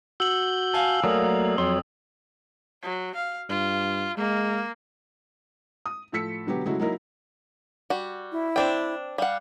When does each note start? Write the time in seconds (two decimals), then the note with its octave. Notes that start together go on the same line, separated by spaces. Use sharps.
0.20 F#4 E6 G6 F#7
0.74 F5 G#5 A5
1.04 F#3 A3 A#3 A#4 D5 D#6
1.58 F2 F#3 C#5 C6
2.82 F#3
3.15 F5
3.49 G2 F4
4.17 G#3 A#3
5.86 D#6
6.12 A2 F3 A4 E6 B6 C#7
6.46 B2 D3 F#3 B3 G4
6.65 C#3 F#3 G#3 A3 E4 F#4
6.80 F#3 A#3 D#4 E4 A#4
7.90 G3 F#4
8.32 E4
8.56 C4 D4 G5
9.18 G3 F5 F#5